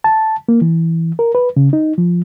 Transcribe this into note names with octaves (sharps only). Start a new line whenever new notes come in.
A5
A#3
E3
A#4
B4
C#3
D#4
F3